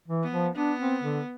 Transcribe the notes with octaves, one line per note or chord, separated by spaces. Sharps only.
E3
B3
F3
B3 D4
C4
D3